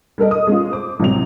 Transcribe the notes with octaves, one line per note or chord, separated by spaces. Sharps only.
G3 A4 A#4 D#5
D#5 D#6
G#3 C#4 F4
C5 D6
A1 C3 F#3 F7